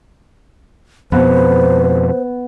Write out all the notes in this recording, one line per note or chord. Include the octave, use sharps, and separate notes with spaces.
F2 B2 B3 C5